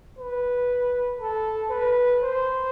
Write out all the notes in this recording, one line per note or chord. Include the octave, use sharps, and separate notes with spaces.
B4
A4
B4
C5